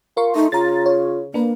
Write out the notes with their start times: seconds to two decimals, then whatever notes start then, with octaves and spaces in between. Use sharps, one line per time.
0.17 F4 A#4 C6 C#6
0.35 A3 D#4
0.52 C#3 F4 A#5 A6
0.86 C#5
1.34 A#3 D4 A#4 B4